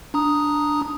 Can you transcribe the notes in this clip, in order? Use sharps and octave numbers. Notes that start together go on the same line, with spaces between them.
D4 A#5 D#6